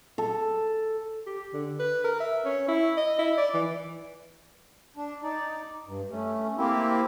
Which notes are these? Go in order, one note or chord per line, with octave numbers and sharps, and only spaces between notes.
A4
G4
D3
B4
A#4
E5
C#4
E4
D#5
E4
D5
E3
D4
D#4 D5
G2
A3 C#4
A#3 C4 E4 G4